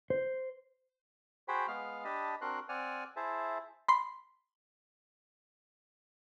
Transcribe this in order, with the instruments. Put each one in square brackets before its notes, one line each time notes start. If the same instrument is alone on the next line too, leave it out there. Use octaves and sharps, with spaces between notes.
[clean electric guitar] C5
[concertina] F#4 G#4 C5 G5 B5
G#3 B3 F5 F6
D4 G4 D#5 A5 B5
C4 D4 F#4 A#4 C6 F#6
C4 D5 F#5 G#5 F6
E4 G#4 C5 E5 A5
[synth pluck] B5 C6